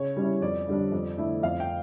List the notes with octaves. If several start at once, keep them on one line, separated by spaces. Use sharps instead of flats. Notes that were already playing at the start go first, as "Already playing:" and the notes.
Already playing: C#3 C#5
G3 C#4 E4
F2 D5
D3 G3 D4
F2
D3 A3 E4
F2 F5
G5